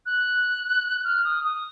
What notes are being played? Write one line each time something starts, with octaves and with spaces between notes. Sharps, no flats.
F#6
F6
D#6
D#6